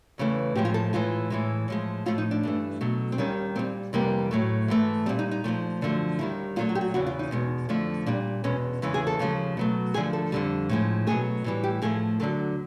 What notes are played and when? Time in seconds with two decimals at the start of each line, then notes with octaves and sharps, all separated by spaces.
0.18 E2 C#3 E3 A3
0.55 A2 F3 G#3 G4
0.65 F4
0.74 A4
0.93 A2 E3 G#3 F4
1.30 A2 E3 G#3
1.68 A2 F3 G#3
2.06 A2 F3 A3 F4
2.18 D#4
2.31 D4
2.43 G2 E3 A3
2.81 B2 F#3 A3
3.12 C4
3.18 D#2 D#3 G3 C#4
3.56 A#2 G3 C4
3.93 F2 C3 E3 G3 A#3
4.31 A2 F#3 A3
4.68 G#2 E3 A3
5.06 A#2 G3 C4
5.19 D#4
5.31 D#4
5.44 A#2 F3 A3
5.81 F#2 D3 F3 A3
6.19 D#2 D#3 G3 E4
6.56 A#2 F#3 A3 F4
6.69 F#4
6.75 G4
6.81 F#4
6.94 E2 C#3 E3 F#4
7.06 F4
7.19 D#4
7.31 E2 B2 G#3
7.69 F2 D3 F3 A3
8.06 A#2 G3 D4
8.44 E2 B2 G#3 C#4
8.82 E2 C#3 E3 G#3
8.94 G#4
9.07 A4
9.19 D#2 C#3 F3 G#3
9.57 B2 F#3 A3
9.94 D#2 D3 F3 A3 G#4
10.13 A4
10.32 F2 D3 G3
10.69 A2 F3 G#3
11.07 B2 F#3 A3 G#4
11.44 A2 E3 G3
11.64 G4
11.82 A2 F3 A3 G#4
12.20 D2 D3 F#3 A3 A4